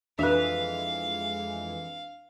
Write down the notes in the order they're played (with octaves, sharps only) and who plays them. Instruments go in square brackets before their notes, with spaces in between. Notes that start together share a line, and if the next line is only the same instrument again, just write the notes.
[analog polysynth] F2 E3 G#3 [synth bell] D4 F7 [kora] B4 E5 [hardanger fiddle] F5